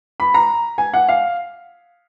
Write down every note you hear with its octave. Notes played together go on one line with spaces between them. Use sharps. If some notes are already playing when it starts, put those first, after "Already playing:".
B5
A#5
G#5
F#5
F5